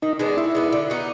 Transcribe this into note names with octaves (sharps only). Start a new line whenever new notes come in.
D#3 D#4
G#3 B3 D4
D#3 E4
G#3 B3 D4
D3
F#3 B3 D#4